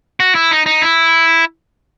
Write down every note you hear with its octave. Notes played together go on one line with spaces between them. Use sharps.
F#4
E4
D#4
D#4
E4